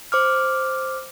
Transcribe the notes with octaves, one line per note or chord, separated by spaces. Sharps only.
C5 D6 F6